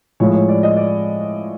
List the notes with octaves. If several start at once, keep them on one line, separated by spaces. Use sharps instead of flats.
A2 F3 G#3 C#5
C#5
D5
D#5
D5